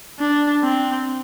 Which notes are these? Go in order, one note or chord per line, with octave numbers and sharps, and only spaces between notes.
D4
C4